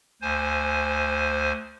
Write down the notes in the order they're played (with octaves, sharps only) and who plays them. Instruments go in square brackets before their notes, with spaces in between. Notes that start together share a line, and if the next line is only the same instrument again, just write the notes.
[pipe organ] D2 C5 G#5